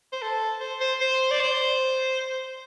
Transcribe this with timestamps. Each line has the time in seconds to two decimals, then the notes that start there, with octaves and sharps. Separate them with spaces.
0.13 C5
0.22 A4
0.61 C5
0.81 C5
1.01 C5
1.31 D5
1.40 C5